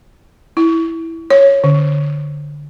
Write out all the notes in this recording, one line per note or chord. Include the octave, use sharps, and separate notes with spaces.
E4
C#5
D3